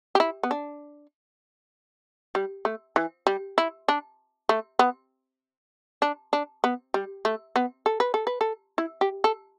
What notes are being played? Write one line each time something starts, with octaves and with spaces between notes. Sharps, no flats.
G4
E4
B3
D4
G3
A3
E3
G3
E4
D4
A3
B3
D4
D4
B3
G3
A3
B3
A4
B4
A4
B4
A4
E4
G4
A4